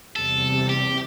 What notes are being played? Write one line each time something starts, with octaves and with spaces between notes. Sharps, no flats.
E2 C3 G3 A4
G4